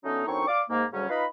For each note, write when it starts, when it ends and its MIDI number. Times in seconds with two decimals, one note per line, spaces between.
0.04 0.23 50
0.04 0.23 54
0.04 0.23 57
0.04 0.23 59
0.04 0.23 61
0.04 0.23 63
0.26 0.46 42
0.26 0.46 45
0.26 0.46 60
0.26 0.46 62
0.26 0.46 63
0.26 0.46 85
0.48 0.62 74
0.48 0.62 77
0.48 0.62 86
0.69 0.84 44
0.69 0.84 58
0.93 1.05 38
0.93 1.05 49
0.93 1.05 54
0.93 1.05 55
0.93 1.05 61
1.09 1.25 63
1.09 1.25 65
1.09 1.25 71
1.09 1.25 75
1.09 1.25 77
1.09 1.25 83